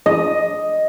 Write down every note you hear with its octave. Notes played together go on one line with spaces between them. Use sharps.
D#5